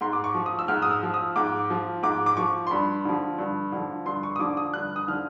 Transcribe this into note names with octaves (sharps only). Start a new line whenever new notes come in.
G#2 C6
D6
C#6
F3
D#6
E6
G#2 F6
D#6
E6
F3
D#6
G#2 D6
F3
G#2 D6
D6
F3 C#6
C6
G2 B5
D3 F3
G2
D3 F3
G2 C6
C#6
D#6
D3 F3 D6
D#6
G2 F#6
D#6
D3 F3 F6